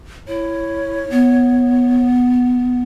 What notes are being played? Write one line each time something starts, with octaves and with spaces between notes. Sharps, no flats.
E4 C#5
B3